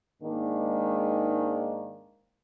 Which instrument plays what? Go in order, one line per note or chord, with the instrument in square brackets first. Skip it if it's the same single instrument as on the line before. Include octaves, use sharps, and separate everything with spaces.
[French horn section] G#2 D#3 G#3 A#3 D4